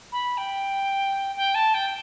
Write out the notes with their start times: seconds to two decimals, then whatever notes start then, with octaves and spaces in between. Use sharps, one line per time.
0.12 B5
0.37 G5
1.36 G5
1.55 A5
1.74 G5